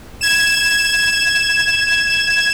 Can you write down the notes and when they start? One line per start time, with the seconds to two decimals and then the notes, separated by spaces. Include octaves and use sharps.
0.21 G#6 E7